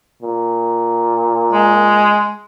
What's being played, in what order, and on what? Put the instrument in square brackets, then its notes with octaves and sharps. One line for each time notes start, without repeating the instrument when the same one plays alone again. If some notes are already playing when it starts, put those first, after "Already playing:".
[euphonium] A#2
[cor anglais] G#3